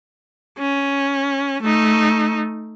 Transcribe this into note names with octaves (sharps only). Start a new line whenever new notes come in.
C#4
A3 D#4